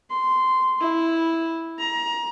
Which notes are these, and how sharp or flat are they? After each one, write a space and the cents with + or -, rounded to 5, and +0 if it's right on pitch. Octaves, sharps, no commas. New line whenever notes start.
C6 -10
E4 -5
A#5 +25